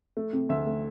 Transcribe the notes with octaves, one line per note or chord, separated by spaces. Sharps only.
A3
C3
D2 E5
A3